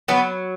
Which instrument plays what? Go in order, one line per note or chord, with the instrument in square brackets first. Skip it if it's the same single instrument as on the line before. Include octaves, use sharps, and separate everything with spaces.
[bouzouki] F#3 B3